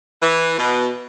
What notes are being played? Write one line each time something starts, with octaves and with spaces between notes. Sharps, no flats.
E3
B2